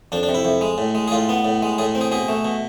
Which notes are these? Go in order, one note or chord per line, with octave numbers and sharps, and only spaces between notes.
F2 D4
D4
C3
E4
F2
G#3
A2
G#3
G#4
A2 F4
B3
A2
G#3
A2 G#4
C4
G#4
B2 G#4
A3
B2